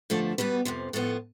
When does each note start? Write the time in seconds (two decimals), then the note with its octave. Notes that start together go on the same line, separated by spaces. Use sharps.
0.10 G2 D3 F3 A3 A4
0.38 E2 B2 G3 B3 B4
0.65 F2 C3 F3
0.93 A2 F3 B3 A4